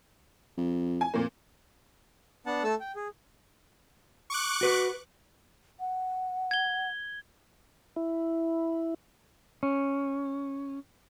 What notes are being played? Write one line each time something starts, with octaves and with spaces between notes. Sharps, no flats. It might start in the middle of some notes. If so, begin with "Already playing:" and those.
F2
G#5
F2 A#2 A#3
B3 D4 F#5 A5
A3 A4 A5 E6
G5
G#4
C#6 D6 F#6
F#4 B4
F#5
G#6 G7
E4
C#4